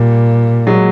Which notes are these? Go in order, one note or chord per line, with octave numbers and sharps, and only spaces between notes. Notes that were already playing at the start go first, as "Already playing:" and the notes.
Already playing: A#2 G3
F#3 G#3